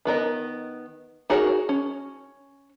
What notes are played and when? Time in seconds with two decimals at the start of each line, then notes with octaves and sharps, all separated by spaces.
0.05 D#3 B3 A#4 D#5
1.30 D#4 F#4 G#4 A#4 C#5
1.69 C#4